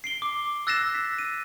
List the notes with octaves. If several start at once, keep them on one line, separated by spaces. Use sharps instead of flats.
C7 D7 G7
D6
E6 F#6 A6 A#6 C7 E7
B6
D#7